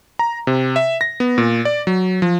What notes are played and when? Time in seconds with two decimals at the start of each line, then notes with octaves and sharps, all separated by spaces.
0.19 A#5
0.47 C3
0.76 E5
1.01 A#6
1.20 B3
1.38 A#2
1.65 D5
1.87 F#3
2.22 F3